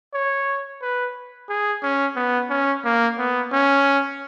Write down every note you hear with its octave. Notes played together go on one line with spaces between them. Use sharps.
C#5
B4
G#4
C#4
B3
C#4
A#3
B3
C#4